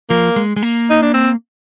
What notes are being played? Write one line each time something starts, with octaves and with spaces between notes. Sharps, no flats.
F3 A#3
G#3
G#3
A#3
D#4
D4
C4